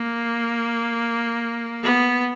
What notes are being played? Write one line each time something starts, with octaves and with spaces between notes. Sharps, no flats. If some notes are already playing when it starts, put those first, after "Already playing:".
Already playing: A#3
B3